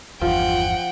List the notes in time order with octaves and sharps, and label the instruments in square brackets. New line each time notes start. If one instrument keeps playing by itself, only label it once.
[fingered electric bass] G1 E2 [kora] F3 [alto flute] F4 [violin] F#5 G5